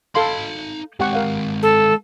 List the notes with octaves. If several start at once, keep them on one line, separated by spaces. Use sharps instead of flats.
D#4 A4 F5 B5 C6
G#3 C4 G4 F#5 C#6
A#4 F5 F#5
A4